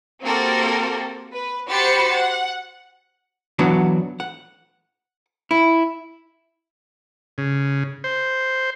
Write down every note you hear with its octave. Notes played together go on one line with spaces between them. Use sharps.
A#3 C4 F#4 G4 A4 A#4
B4
F#4 G4 C5 B5 A6 C#7
F#5
E3 F#3 B3 D4 F#4
F#5
E4
C#3
C5